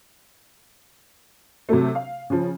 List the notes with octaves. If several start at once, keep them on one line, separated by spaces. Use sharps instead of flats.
C3 F#3 A3
F5
C#3 F3